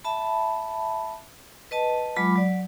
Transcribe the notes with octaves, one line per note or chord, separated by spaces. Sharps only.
E5 A5 B5
B4 D#5 A5
F#3 G#3 F4 B5 D6
F#3 D5